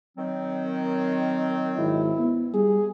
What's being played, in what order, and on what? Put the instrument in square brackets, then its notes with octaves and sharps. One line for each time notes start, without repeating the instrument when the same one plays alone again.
[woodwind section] D#3 F#3 C4
[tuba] G#1 [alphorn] E4
[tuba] B3
[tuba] G3 [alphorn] G#4